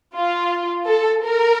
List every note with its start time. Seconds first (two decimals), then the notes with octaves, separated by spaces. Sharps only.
0.17 F4
0.89 A4
1.25 A#4